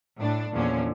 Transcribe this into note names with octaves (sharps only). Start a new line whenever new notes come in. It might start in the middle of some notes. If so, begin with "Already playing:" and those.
A2 D4
E2 A#2 D3 F3 C#4